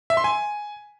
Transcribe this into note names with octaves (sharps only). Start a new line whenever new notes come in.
E5
C6
G#5